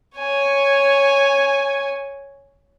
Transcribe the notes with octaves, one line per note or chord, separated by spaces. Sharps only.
C#5 G#5